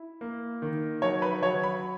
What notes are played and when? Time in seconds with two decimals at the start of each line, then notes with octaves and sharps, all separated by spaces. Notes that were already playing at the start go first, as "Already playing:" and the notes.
Already playing: E4
0.21 A#3
0.62 D#3
1.02 F#3 C#5
1.22 B4
1.42 F#3 C#5
1.63 B5